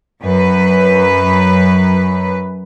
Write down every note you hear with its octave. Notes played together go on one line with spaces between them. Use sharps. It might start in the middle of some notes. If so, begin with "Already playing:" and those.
F#2 B4